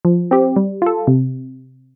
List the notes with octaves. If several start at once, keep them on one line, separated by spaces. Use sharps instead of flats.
F3
C4 G4
G3
F4 A4
C3